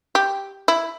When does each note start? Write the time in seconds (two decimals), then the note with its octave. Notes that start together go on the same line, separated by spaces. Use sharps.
0.15 G4
0.68 E4